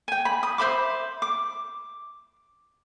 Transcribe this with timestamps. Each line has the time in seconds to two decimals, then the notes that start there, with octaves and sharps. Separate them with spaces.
0.08 G5 G#5
0.25 B5
0.43 D#6
0.58 C5 E5 B5 D6
1.22 D6